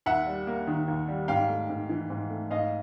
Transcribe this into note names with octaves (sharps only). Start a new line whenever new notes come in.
D#2 E5 F#5
G3
A#3
D#3
D#2
G3
G#2 F5 G5
A3
G#2
E3
G#2
A3
G#2 D#5 F5